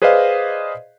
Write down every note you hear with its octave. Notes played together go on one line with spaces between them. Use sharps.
G#4 B4 C5 D5 D#5 F5